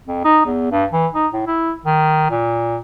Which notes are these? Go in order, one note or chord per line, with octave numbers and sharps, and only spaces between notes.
F2
D#4
E2
G2
E3
D#4
A2
E4
D#3
A#2